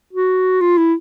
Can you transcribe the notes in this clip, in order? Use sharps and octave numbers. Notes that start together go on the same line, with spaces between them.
F#4
F4
E4